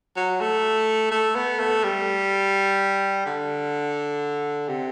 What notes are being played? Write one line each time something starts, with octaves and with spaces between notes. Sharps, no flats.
F#3
A3
A3
B3
A3
G3
D3
C3